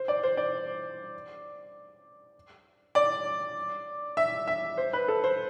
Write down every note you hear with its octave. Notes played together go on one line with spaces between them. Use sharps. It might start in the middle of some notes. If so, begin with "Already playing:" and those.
Already playing: C5
D5
C5
D5
D5
E5
E5
C5
B4
A4
C5